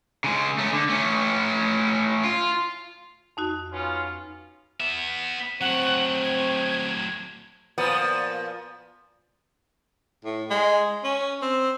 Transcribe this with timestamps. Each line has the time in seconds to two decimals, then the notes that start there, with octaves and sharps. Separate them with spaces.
0.24 C#3 G#3
0.59 A3 C#4
0.73 D3
0.89 A3 C#4
2.24 F4
3.37 F2 D#4 F#4
3.72 B3 C#4 F4
4.80 B3 E5
5.61 F#3 A3 C4 F#5
6.24 G#6
7.78 A#2 F3 B3
10.25 A2
10.50 G#3
11.04 C#4
11.42 C4